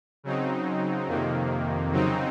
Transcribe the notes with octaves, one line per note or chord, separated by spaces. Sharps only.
C#3 F#3 C4 D#4
F2 C3 D#3 A#3
C#3 F#3 C4 D#4